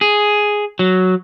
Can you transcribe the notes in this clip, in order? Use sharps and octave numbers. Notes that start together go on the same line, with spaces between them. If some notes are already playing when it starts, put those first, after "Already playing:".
G#4
F#3